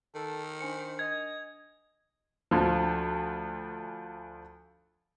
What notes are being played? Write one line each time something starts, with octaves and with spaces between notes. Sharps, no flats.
D#3 A4
D4 C5 G#5 C#7
D#5 G#6
D2 F3